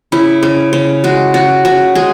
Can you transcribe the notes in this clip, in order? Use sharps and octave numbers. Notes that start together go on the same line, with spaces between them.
C#3 E4
C#3
C#3
G#3 F#4
C#3 F#4
C#3 F#4
G#3 G#4